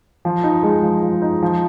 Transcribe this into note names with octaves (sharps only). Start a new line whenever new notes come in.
F3
D#4
G#3
F3
F3
D#4
F3